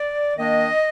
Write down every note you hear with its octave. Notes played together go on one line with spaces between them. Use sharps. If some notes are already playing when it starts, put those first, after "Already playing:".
Already playing: D5
D#3 A#3 D4 D#5